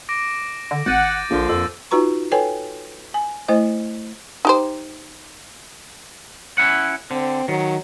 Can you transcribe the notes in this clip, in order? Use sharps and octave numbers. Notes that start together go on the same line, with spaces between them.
D6 A#6 D7
D3
G#1 F#5 G6 A6 D#7
A#1 A#2 D3 F3
F2 E6
D#4 F4 F#4 B4 A#5 C#6
A4 B4 C#5 G5 G#5
G#5
A3 E4 C5 D#5
D#4 G4 C5
C#4 E4 F#5
D3 C4
D#3 F#3